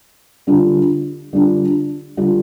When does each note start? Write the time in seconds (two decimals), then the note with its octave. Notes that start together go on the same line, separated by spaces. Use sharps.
0.47 D3 G3 D4 F4
1.33 D3 G3 D4 F4
2.17 D3 G3 D4 F4